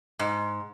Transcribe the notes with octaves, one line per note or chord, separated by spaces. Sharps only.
G#2